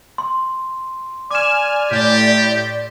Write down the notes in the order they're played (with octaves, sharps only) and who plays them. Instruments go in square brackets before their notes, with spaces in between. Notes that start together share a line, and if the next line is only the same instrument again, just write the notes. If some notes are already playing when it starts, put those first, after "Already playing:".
[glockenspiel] C6
[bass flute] D5 [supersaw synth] G#5 F6 [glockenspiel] D6 E7
[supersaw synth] A2 G6 A6 [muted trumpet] G4